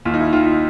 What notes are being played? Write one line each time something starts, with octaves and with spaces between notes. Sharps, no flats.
D#2 F4
D#4
E4
D#3 F4
F4